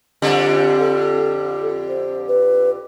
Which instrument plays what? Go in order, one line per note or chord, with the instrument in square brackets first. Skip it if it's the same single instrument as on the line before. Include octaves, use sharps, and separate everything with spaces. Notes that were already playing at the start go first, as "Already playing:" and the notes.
[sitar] F2 D3 G3
[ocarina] A4
C5
B4